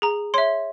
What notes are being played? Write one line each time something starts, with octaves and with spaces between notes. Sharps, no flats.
G#4 A#5
C#5 E5 C6